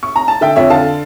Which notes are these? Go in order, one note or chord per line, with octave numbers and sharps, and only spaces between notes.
C#6
A#5
A5
D3 E5 G5
F2 C#5 E5
D3 F5 A5